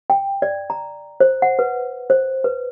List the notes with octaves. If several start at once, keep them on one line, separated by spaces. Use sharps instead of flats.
G5
D5
A#5
C5
F#5
B4
C5
B4